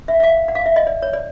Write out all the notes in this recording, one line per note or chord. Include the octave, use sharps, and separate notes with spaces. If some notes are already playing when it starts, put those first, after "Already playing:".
E5
E5
F5
F#5
F5
E5
D#5
D5
C#5
D5